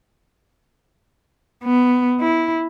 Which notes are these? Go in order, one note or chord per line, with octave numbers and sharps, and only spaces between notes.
B3
E4